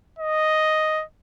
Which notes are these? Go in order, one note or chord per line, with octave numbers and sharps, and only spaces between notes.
D#5